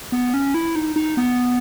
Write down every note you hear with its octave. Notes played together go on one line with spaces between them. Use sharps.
B3
C#4
E4
D#4
D#4
B3